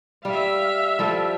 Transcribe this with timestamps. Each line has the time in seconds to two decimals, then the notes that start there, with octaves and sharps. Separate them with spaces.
0.25 G3 E5 F5
0.99 F3 G3 A4